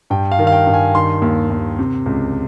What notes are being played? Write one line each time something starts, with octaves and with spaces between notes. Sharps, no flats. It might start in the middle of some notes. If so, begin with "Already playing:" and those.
G2 G5
F5
D#3
F5
G5
G2
G#5
D#3 C6
D#2
D#2
C3
C#2